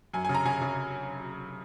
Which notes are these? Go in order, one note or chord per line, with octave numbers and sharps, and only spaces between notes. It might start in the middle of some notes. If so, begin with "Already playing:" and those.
F#2 G#5
G#5
C#3
A#5
C#3 G#5
C#3